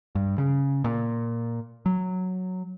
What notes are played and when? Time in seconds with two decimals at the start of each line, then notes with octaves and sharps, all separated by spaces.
0.15 G2
0.38 C#3
0.84 A#2
1.86 F#3